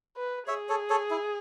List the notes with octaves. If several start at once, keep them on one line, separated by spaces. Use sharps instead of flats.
B4
G#4 C#5 E5
A4 C#5
A4 C#5
E4